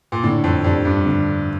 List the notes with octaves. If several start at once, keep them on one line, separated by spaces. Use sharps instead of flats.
A#2
A2 D3
F2
F2 G3 D4
G2
D3